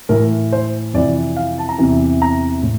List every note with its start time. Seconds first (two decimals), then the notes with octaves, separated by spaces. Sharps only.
0.09 A2 E3 A#4
0.52 C5
0.94 F2 C3 E3 D5
1.37 F5
1.58 A5
1.69 A#5
1.78 E2 C3 E3
2.22 A#5
2.63 A2